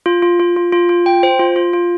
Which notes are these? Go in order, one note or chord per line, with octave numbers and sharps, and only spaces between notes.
F4
F4
F4
F4
F4
F4
G5
C5
F4
F4
F4